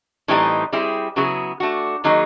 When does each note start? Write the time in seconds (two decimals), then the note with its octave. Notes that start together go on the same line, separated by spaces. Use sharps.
0.28 A2 E3 G3 C4 D#4
0.72 G3 C4 E4 G#4
1.16 C#3 F#3 B3 E4 G#4
1.60 A3 D4 F#4
2.04 D#3 F#3 A#3 D#4 G#4